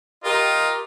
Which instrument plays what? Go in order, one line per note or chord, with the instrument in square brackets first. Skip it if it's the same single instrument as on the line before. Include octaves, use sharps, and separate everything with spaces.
[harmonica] F4 D#5 [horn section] G4 A#4